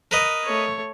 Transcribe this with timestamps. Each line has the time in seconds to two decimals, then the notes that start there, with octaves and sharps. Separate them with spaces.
0.11 A#4 B4 D#5
0.45 A3 C#5